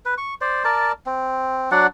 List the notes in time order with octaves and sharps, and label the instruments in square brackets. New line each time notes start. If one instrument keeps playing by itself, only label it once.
[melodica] B4
C#6
C5 D5
A#4 D5 A5
C4
F#3 D4 D5 F#5